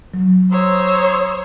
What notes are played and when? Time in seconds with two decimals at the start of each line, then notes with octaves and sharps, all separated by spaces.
0.14 F#3
0.51 C5 C#5 A#5 D#6 E6